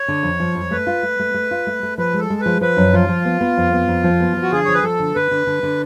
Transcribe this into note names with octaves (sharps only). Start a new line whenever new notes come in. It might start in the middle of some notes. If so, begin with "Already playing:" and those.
Already playing: C#5
D3
F2
F3
F2
A3 B4
F4
A3
A3
A3
F4
A3
A3
F3 B4
G#3
A4
G#3
F3 B4
F3 B4
F#2
F3 F4
F3
B3
B3
F2
B3
F2
F3
B3
F3
F#4
D3 G#4
F3 C#5
B4
F3 A4
D3
D3 B4
D3
D3
D3